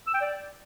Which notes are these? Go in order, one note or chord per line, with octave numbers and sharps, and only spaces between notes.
E6
G5
D5